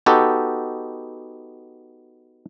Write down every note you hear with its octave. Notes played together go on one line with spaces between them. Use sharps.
B3 D#4 F#4 G4 A4